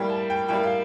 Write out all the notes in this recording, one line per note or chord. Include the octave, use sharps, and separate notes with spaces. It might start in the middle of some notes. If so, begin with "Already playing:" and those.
Already playing: A2 G3 A#3 G5
A5
G5
A2 G3 A#3 G5
F5